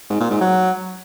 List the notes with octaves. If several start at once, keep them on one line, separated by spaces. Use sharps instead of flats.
G#2
A#2
G#2
F#3